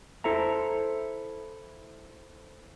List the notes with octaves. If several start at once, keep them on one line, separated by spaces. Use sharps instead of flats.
E4 A4 C5 E5 A#5